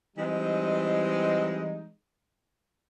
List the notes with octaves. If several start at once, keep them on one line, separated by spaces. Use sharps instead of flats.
E3 G3 G#3 C4 D#4